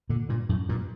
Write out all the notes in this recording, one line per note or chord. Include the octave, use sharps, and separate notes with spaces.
A#2 D3
G2 A#2
F#2 A2
G2 A#2